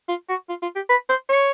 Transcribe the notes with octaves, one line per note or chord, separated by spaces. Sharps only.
F4
F#4
F4
F4
G4
B4
C5
C#5